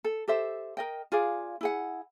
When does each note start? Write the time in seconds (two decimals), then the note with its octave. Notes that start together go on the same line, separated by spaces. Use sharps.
0.04 A4
0.28 G4 A4 C5 E5
0.77 A#4 D#5 G5
1.12 F4 G#4 D5 F5
1.61 E4 G#4 F#5